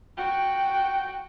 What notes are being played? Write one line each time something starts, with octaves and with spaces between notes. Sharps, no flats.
F#4 G5